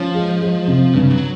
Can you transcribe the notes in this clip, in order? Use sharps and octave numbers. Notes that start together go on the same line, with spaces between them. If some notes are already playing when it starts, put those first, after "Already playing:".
Already playing: F3 C#4
G#3
G#3
C3
G2 C#3
F#3